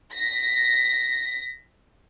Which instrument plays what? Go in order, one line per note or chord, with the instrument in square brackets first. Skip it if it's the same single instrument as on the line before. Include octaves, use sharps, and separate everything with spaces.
[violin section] A#6 B6